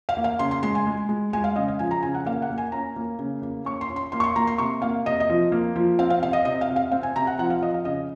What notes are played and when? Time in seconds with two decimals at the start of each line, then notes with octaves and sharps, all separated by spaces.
0.09 F5
0.17 A#3
0.24 F5
0.39 C#3 C6
0.51 C6
0.63 G#3 C6
0.75 G#5
0.87 G#3
1.09 G#3
1.33 G#3 G#5
1.44 F5
1.56 C#3 D#5
1.68 F5
1.79 F3 G#5
1.91 A#5
2.02 C#3 G#5
2.14 F#5
2.26 A#3 F5
2.42 F#5
2.50 A#3
2.58 G#5
2.72 C#4 A#5
2.96 A#3
3.19 C#3
3.42 A#3
3.65 C#4 C#6
3.81 C6
3.90 C#4
3.96 C6
4.12 A#3 C6
4.20 C#6
4.24 C6
4.36 A#3 A#5
4.47 C6
4.58 C3 C#6
4.82 A#3 F5
5.06 C3 D#5
5.20 D#5
5.30 F3
5.52 A#3
5.76 F3
5.99 C4 F5
6.10 F5
6.22 C3 F5
6.33 D#5
6.45 C3 D#5
6.61 F5
6.69 C3
6.76 F5
6.92 C4 F5
7.03 G#5
7.16 C3 A#5
7.27 F#5
7.39 F3 F#5
7.50 F5
7.61 F3 D#5
7.74 F5
7.85 C#3 D#5